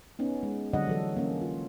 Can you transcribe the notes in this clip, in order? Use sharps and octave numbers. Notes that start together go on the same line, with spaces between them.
B3 C#4 D#4
G#3
D3 F#3 G3 D4 D#5 F#5
E3 F#3 A4
A#3 C#4
F4